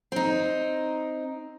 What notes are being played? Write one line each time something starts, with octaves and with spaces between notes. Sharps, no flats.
C4 D#4